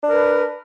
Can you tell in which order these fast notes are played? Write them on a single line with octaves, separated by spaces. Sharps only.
D4 A#4 B4